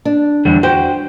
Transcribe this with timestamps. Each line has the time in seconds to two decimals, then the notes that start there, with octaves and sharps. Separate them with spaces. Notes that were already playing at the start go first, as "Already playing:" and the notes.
0.05 D4
0.45 E2 D3 G3
0.63 F#4 C5 G5